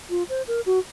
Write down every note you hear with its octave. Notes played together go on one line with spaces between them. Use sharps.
F4
C5
A#4
F#4